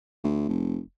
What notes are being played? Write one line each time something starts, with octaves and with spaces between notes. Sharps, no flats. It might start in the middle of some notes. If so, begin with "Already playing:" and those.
D2
F1